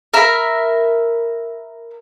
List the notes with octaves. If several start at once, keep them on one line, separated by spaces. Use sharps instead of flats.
A#4 E5 B5